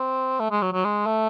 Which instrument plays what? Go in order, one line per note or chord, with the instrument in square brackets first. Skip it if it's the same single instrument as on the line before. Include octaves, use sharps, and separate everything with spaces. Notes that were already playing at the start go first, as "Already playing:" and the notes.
Already playing: [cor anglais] C4
A3
G#3
F#3
F#3
G#3
A3